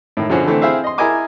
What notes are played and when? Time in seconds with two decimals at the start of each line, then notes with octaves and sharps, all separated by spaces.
0.17 A2 D#3
0.30 B2 D3 F3 C#4 F#4 G#4
0.46 D3 E3 A3 C4
0.61 C4 E4 G#4 C5 E5 F5
0.84 D#5 C6
0.98 E4 G#4 A#4 D#5 G#5 D6